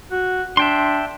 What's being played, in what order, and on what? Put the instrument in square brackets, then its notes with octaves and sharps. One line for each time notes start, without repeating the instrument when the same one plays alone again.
[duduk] F#4
[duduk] D4 [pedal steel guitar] E5 G5 C6